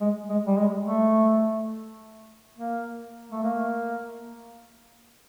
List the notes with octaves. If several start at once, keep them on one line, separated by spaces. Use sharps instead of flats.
G#3
G#3
G3
G#3
A3
A#3
A3
A#3